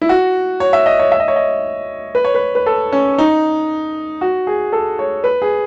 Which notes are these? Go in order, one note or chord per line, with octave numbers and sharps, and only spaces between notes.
E4
F#4
C#5
E5
D#5
C#5
E5
D#5
C#5
D#5
B4
C#5
B4
B4
A4
C#4
D#4
F#4
G#4
A4
C#5
B4
G#4